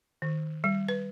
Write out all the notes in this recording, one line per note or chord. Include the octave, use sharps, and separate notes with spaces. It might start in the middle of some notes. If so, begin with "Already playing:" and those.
D#3
G3
B4